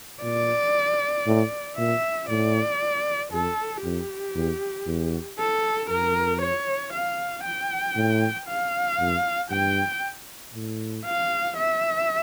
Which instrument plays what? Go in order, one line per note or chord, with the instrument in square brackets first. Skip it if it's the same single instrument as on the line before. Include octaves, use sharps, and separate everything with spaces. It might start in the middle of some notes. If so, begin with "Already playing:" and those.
[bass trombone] A#2 [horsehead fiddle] D5
[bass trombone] A2
[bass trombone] A#2 [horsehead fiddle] E5
[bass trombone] A2 [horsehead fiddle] D5
[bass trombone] F2 [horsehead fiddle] A4
[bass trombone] F2 [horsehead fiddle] G4
[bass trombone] E2
E2
[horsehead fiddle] A4
[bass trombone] F2 [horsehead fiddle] A#4
[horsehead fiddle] C#5
F5
G5
[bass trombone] A2
[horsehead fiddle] F5
[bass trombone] F2
[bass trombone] G2 [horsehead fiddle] G5
[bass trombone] A2
[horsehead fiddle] F5
E5